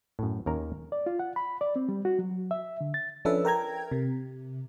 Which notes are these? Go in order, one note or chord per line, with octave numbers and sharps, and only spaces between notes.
F#2 A2
D#2 C#4 A#4 A#5
D5
F4
F#5
B5
D5
C4
G3
F#4
F#3
E5
D3
A6
F3 C#4 D4 A4 B4 E5
A#4 G5 A#5 G#6
C3